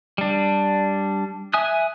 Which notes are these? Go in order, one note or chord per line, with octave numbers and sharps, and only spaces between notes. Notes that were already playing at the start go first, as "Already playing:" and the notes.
G3 D4
E5 G#5 D#6 F#6